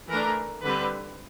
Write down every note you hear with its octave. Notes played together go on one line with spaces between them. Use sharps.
E3 A3 D4 A#4
D3 G3 C4 B4